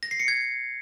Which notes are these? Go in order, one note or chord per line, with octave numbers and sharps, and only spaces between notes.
A#6
C7
C#7
G#6